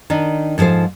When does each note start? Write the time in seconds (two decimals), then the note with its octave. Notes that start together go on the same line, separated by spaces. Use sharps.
0.10 D#3 D4 D#4
0.58 G#2 F3 G4 A4 C5